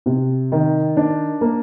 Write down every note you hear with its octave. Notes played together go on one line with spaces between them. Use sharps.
C3
D#3
D4
A#3